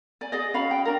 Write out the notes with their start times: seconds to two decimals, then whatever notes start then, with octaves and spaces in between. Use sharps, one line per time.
0.21 D5 G#5
0.32 G#4 D5 D#5
0.54 C#4 F#4 F5 B5
0.71 G5
0.85 D4 A#4